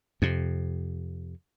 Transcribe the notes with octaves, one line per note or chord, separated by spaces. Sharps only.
F2 C3